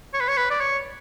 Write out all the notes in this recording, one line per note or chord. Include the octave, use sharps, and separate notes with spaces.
C#5
B4
C#5
B4
D5
C#5